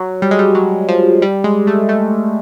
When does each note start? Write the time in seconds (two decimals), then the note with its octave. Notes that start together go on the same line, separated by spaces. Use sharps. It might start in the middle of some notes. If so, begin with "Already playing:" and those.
Already playing: F#3
0.22 G3
0.31 G#3
0.39 G3
0.55 F#3
0.89 F3
1.22 G3
1.44 G#3
1.67 A3
1.89 A3